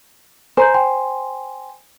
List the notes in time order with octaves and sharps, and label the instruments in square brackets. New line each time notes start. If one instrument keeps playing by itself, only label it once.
[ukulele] C5 [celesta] G#5 A#5 G6
[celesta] G5 G#5 C6